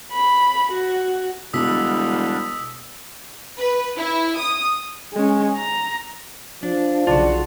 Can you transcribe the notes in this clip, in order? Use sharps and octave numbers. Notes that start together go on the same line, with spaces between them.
B5
F#4
E1 B2 D3 G3 D4 D#6 E6 B6
B4
E4
D#6
G#3 C#4
A#5
F3 D4
B1 C#3 D4 F4 F#4